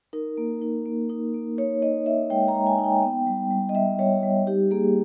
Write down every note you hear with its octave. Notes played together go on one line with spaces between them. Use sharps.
D#4 A#4
A#3
D#4
A#3
D#4
A#3
D#4 C#5
D#4 D#5
D#4 E5
G#3 G5
A#5
G#3
G#5
D#4
G5
B3
G3
G3
D#5
G3 E5
G3 C#5
G3
D#4 G4
A#3 G#4